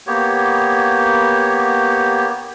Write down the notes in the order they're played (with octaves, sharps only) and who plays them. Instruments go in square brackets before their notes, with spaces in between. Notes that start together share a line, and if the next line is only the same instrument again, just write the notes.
[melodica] A#3 B3 G4 C#5